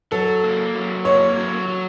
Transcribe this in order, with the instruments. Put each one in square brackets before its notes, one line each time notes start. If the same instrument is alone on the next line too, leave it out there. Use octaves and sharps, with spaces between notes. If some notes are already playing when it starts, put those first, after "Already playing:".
[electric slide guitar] F#3 [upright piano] A4
[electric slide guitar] A#3
F#3
[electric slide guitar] A#3 [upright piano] C#5
[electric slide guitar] F#3
F#3